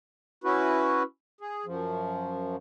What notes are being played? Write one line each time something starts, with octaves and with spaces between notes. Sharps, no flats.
C#4 E4 F#4 B4
G#4
F#2 F3